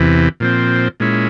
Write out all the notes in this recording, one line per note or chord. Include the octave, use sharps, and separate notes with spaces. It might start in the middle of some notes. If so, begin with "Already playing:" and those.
Already playing: E2 C3 E3
A#2 F3 C4
A#2 G#3 C#4 E4